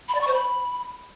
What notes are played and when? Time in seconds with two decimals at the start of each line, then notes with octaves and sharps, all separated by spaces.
0.08 B5
0.15 D5
0.21 C#6
0.27 C5
0.34 B5